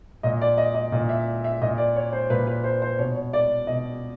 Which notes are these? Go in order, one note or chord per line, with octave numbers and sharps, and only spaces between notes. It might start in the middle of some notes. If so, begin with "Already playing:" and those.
A#2 D#5
D5
D#5
D#5
A#2 D#5
E5
E5
A#2 D#5
D5
C#5
C5
A#2 B4
B4
C5
C5
B2 C#5
C#5
D5
B2 D#5